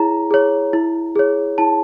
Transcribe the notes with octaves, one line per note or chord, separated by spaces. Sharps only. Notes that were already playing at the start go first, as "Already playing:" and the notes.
Already playing: E4 G#4 C#5 A#5
G#4 C#5
E4
G#4 C#5
E4 A5